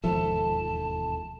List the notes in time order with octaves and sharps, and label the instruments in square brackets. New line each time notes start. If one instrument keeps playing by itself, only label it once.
[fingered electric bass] E1 D#2 G#2 [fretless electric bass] F3 [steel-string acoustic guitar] A4 E5 [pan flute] A5